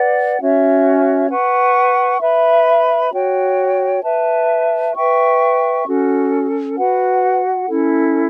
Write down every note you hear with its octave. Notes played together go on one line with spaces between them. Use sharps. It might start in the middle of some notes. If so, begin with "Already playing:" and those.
Already playing: B4 D5 F#5
C#4 F#4 C#5 E5
B4 F#5 C#6
B4 E5 B5
F#4 C#5 G5
B4 E5 A5
B4 E5 G5 C#6
C#4 F#4 A4
F#4 B4 F#5
C#4 E4 A4